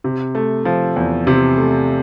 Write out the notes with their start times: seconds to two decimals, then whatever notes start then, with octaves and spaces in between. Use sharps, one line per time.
0.04 C3
0.35 A3
0.65 F3
0.96 E2
1.27 C3
1.57 A3